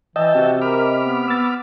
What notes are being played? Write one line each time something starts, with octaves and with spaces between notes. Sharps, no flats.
E3 D#5 E5 G5 A5
C3 F#4
A#4 B5 D6 F6
B3
B3 E6 A6